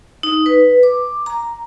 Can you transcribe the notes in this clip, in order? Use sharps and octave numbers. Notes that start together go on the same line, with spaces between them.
D#4
B4
D6
A#5